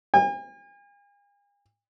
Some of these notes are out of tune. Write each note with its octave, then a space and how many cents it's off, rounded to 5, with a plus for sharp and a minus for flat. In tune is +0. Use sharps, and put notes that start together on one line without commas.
G#5 -45